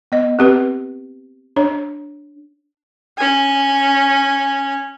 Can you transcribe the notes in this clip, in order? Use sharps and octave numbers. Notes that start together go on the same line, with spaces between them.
B3 D#5
C4 G4 B4
D4 C#5
C#4 G#5